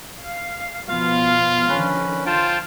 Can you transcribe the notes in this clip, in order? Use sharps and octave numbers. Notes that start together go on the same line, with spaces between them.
F5
B2 F3 B3 F4 F5
D3 D#3 F3 C#4 B4
F4 C5 G5 A5